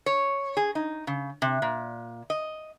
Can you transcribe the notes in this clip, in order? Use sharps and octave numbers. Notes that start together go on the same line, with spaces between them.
C#5
G#4
D#4
C#3
C3
A#2
D#5